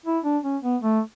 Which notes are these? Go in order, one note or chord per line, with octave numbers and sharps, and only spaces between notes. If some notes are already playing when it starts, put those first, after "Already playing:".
E4
D4
C#4
B3
A3